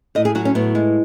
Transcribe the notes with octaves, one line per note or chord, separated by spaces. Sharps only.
A2 D#5
G#4
F#3 F#4
C#4
A2 B3
G#3